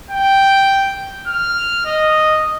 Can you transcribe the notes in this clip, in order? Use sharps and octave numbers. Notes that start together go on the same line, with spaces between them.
G5
F6
D#5